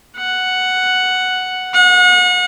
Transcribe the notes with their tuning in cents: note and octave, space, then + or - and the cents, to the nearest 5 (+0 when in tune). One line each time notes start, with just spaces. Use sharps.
F#5 +0
F#5 -35